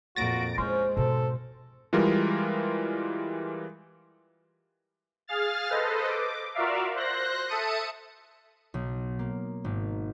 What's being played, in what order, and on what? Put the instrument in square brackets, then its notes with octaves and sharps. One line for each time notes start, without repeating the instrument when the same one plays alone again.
[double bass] F2 A#2 [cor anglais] F#4 [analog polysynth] A6 A#6 D7
[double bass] G#3 [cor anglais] C#4 [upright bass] E4 [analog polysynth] C5
[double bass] G#2 [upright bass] B2 [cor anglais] A4
[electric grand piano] E3 G3 G#3 F4 A#4
[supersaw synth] G#4 F5 F6 A6
A4 B4 C5 D#5
D6
F4 F#4 A#4 D5 E5 F5
C5 C6 F#6 A#6
A4 E5 A5 D#6 C#7 D#7
[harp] B1
A#3
G#1